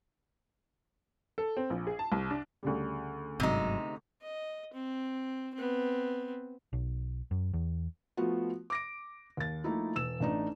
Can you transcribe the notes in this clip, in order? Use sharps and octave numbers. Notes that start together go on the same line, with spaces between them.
A4
C4
A#1
G#4
A5
C2
D4
D2 C#3 G3
G1 G#2 C3 F#3 D#4
D#5
C4
B3 C4
B1
F#2
E2
F3 A3 B3 F4 F#4
D6 A#6 D7
D#2 A6
F3 A3 A#3 D#4 E4
E1 E6 E7
A1 A3 D4 D#4